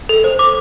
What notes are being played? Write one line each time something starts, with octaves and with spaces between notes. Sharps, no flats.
A4
C5
D6